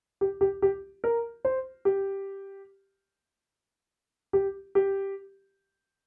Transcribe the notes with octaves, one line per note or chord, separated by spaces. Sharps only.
G4
G4
G4
A#4
C5
G4
G4
G4